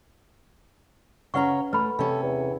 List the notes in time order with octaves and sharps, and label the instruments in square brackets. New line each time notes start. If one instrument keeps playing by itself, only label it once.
[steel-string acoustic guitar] C#3 C#5 A#5 [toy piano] B4 F#5 C#6
[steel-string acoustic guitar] A3 [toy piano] B4 B5
[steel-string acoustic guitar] C3 C#4 [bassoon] A4
[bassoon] E2